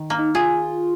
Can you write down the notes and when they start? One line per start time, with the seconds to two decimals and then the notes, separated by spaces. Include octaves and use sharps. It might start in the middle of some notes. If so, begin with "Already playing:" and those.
Already playing: D#3
0.10 A#3
0.18 D#4
0.35 F4 G#4